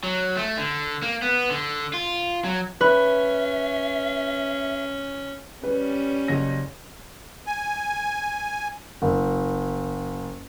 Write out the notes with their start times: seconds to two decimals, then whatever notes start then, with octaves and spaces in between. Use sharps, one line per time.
0.03 F#3
0.37 A3
0.58 D3
1.02 A#3
1.22 B3
1.51 D3
1.93 F4
2.44 F#3
2.81 C#4 B4 E5
5.63 G3 C#4 B4
6.28 F#1 A#6
7.47 G#5
9.02 F#1